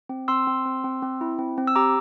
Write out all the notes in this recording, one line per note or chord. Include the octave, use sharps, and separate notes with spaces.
C4
C4 C6 E6
C4
C4
C4
C4
E4
C4
C4
E6
G4 A#5 D6